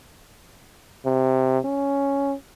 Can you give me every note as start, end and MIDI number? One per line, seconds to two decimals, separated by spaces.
1.05 1.59 48
1.65 2.34 61